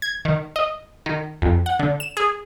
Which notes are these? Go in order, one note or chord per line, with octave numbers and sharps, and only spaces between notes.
G#6
D#3
D#5
D#3
F2
F#5
D3
E7
G#4